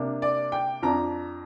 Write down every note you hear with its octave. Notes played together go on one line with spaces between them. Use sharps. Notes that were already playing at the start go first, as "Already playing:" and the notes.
Already playing: C3 A#3 D4
D5
G5
F2 F3 D4 A#5